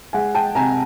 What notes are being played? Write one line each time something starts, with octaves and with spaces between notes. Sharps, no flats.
G#3 F#5 G#5
G5 A5
C3 G#5 A#5